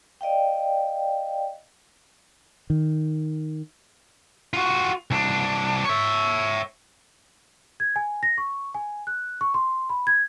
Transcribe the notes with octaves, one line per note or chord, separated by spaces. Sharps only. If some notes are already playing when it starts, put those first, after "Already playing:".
D5 D#5 F5 G5
D#3
F4 F#4
C2 D4
C#5 E5
G#6
G#5
A#6
C#6
G#5
F#6
C#6
C6
B5
G#6